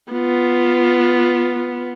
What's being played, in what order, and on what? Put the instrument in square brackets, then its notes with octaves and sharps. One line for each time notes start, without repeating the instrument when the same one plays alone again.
[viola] B3 F4